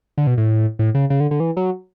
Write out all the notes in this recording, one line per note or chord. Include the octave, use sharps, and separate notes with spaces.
D3
B2
A2
A2
C#3
C#3
D3
D3
E3
F#3